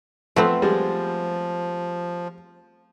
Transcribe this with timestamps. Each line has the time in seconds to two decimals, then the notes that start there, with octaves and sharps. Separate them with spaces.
0.36 F3 A3 B3 C4
0.62 F3 G3 G#3